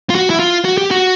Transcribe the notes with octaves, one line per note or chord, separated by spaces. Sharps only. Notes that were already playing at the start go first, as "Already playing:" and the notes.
F4
F#4
E4
F4
F#4
G4
F#4